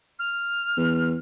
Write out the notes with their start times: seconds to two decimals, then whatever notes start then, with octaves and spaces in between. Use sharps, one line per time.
0.19 F6
0.77 E2